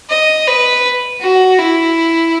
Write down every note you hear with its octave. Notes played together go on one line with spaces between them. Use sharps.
D#5
B4
F#4
E4